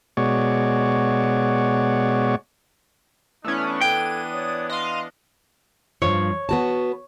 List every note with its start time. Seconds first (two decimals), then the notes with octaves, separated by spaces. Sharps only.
0.17 B2 G#3 F#4 C#5 D5
3.44 E3 A3 B3 C#4 D4 E4
3.81 A4 G5 G#6 D#7
4.31 C#5 D5 D#6
4.70 D#5 F5 C6
6.02 G2 F3 C#5
6.49 B3 F#4 A5